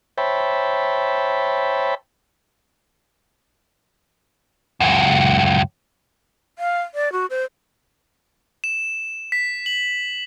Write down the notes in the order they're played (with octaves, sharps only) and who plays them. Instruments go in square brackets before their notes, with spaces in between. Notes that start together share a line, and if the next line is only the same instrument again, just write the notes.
[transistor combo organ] C5 C#5 E5 G5 A5 B5
[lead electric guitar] C#2 F#2
[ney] F5
D5
F#4
C5
[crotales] E7
B6
F#7